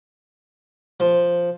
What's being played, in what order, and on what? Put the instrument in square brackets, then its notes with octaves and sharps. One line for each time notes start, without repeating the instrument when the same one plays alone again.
[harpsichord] F3